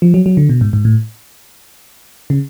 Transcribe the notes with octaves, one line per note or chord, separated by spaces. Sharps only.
F3
F#3
F#3
D3
B2
G#2
G#2
A2
C#3